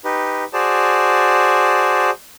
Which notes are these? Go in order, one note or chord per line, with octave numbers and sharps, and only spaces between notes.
D#4 G4 B4
F#4 G#4 C5 D5 A5